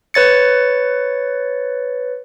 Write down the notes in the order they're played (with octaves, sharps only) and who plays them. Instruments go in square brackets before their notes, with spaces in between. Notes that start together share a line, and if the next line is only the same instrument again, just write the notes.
[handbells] B4 C#5 A6 C#7